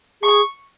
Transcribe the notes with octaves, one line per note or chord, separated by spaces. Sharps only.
G#4 C#6